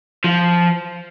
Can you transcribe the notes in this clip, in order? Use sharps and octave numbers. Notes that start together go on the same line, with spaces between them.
F3